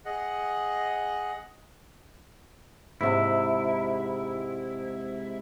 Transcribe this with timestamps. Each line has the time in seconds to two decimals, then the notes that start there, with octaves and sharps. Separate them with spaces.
0.05 G#4 D#5 F#5
3.01 G#2 C3 E4